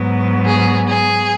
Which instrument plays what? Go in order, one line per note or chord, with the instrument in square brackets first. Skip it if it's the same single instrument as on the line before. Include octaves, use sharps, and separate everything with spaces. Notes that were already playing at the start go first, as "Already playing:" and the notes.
Already playing: [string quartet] G#2 F#3 B3
G#4
G#4